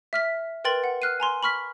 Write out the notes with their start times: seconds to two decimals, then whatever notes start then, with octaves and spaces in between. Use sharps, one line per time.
0.13 E5 F6 B6
0.64 A#4 B4 G5 C6 A6 F#7
0.84 F#5
1.02 F6 F#6 C7 D#7
1.20 G#5 A#5 C6
1.43 B5 C#6 F6 B6